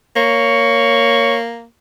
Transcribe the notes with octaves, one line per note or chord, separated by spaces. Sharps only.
A#3 C#5